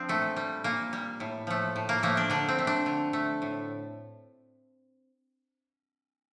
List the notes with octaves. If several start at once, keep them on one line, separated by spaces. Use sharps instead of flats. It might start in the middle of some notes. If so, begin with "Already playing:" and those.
Already playing: F3 C4 D4
A#2 A3
G3
A#2 A#3
G3
A2
F3 A3
A2
A#3
F3 A3 A#3
D4
D3 D4
C4
A3
D4
D3
A3
A2